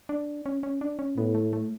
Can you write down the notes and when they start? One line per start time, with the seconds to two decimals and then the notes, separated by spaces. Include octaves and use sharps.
0.09 D4
0.46 C#4
0.63 C#4
0.81 D4
0.99 C#4
1.17 A2 B3
1.35 A3
1.53 A3